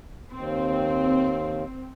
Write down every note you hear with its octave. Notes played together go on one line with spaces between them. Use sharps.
D#2 C4